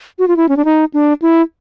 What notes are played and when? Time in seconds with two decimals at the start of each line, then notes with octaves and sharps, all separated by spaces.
0.19 F#4
0.28 F4
0.37 E4
0.49 C#4
0.57 D4
0.65 D#4
0.94 D4
1.22 E4